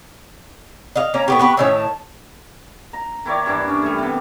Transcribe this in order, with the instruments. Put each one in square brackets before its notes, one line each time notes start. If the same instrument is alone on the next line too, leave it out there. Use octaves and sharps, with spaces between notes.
[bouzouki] D#5 F5
[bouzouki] A#3 C#4 F5 [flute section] A#5
[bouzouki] A2 B3 G4 [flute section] B5 C#6
[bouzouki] B3 G4 B4
[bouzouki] A2 D#3 C#5 [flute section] C#4 E6
[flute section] A5
[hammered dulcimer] A#5
D#3 E4 C#5 D5
G2 E3 D4
C#4
G3 A3
C3 B3